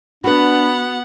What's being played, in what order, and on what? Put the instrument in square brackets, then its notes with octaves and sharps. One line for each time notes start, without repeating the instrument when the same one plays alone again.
[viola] B3 F#5 [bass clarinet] D4 [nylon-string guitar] F#4 B4 [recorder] B5